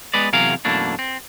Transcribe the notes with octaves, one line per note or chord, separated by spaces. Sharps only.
G#3 B3 B4 D5
E2 C3 F#3 G#4 A#4 F5
F#2 B2 E3 A3 A#3 D4
C4